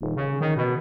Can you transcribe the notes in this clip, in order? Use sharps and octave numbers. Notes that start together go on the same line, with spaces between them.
D#1
C#3
D#3
B2